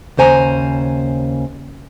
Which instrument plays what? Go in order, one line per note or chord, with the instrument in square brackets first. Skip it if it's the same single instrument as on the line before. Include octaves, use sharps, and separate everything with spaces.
[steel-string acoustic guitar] D#2 C#3 C5 G#5 A#5